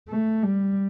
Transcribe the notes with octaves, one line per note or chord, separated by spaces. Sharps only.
A3
G3